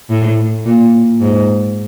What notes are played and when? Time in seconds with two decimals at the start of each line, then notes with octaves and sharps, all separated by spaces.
0.10 A2
0.66 A#2
1.21 G#2